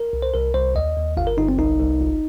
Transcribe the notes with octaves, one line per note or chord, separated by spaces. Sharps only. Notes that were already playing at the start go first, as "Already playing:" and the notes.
Already playing: A#4
C2
C5
C2 A#4
C2 C5
D#2 D#5
D#2
G1 F5
A#4
G1 D#4
C4
C2 D#4
C2
G1